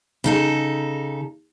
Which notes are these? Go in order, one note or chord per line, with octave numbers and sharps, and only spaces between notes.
C#3 D#4 A4